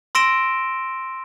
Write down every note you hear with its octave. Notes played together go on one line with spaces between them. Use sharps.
C6 E6 A#6 D7 E7 G7